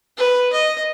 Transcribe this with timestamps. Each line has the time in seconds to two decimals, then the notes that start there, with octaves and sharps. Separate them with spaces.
0.17 B4
0.53 D#5